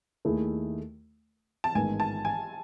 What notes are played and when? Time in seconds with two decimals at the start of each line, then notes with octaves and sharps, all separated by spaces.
0.25 D#2 D#3 A3 E4 G#4
1.64 A5
1.75 A1 G#2 D#3 G#3 B3 G#5
2.00 A5
2.25 G#5